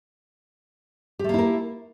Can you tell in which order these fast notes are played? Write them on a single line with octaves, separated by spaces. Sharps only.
G4 A3 A#3 E4 A#4